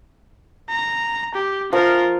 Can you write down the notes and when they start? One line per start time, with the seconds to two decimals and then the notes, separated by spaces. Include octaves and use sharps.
0.70 A#5
1.35 G4
1.73 F3 F4 A#4